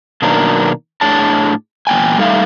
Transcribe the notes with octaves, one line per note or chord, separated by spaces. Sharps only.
B2 D#3 F#3 A#3 D4 A#4
A2 D4 G#4 C#5 A5
E2 A#2 G5 G#5
G3 A3 D#4 E5 F5